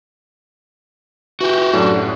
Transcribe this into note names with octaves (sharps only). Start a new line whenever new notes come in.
E3 F#4 G4
F#2 A2 D3